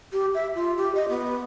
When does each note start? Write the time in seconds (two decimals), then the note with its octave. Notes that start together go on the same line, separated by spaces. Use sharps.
0.13 G4
0.35 E5
0.55 F4
0.77 G4
0.95 D#5
1.09 B3